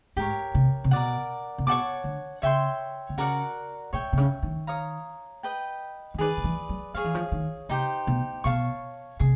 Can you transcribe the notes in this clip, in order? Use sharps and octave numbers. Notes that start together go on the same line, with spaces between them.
G#2 G4 A#4 C#5
C3
C3
B2 A#4 D5 F#5
C3
B2 C#5 F#5 A5 D6
D3
C#3 C#5 E5 G5 C6
D3
C#3 F#4 A#4 D5 F#5
A#2 C#5 E5 G5
C3
C#3
D#3
C#5 F5 A#5 D#6
B4 D#5 G5
E3
D#3 G#4 B4 D5
D#3
E3
F#3
F3 G#4 C#5 F5
E3
F3
D#3
C3 D#4 G4 C5
B2
B2 C#5 F5 A5 C#6
C3 G#4